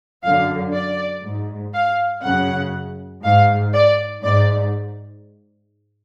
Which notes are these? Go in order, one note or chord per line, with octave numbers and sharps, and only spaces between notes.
F#2 D3 F5
D5
G#2
F5
F#2 C#3 F#5
G#2 F5
D5
G#2 D5